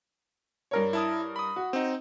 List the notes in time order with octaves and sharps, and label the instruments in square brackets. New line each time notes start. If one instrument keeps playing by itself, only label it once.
[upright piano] G2 A#4 C#5
[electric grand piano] E4 A5 D#6
B5 D#6
[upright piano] F#4
[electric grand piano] C4 D#4